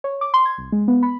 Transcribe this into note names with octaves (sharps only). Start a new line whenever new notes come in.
C#5
D6
C6
G#6
C2
G#3
B3
B5